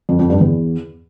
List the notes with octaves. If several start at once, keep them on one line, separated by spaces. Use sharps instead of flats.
F2
F2
G2
E2